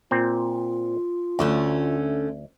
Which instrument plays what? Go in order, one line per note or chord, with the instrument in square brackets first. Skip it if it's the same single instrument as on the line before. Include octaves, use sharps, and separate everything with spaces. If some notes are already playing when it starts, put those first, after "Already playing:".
[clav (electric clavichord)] A#2 C4 [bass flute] F4
[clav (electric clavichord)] D2 [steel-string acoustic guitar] D3 A3 C#4